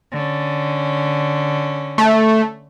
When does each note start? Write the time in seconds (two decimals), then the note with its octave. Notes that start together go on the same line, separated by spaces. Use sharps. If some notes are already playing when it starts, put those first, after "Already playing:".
0.11 D3 C#4
1.98 A3